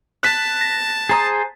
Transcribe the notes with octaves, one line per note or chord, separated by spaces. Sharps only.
A5 F#6 B6
A#6
G#4 C5 A#5 D#6 A6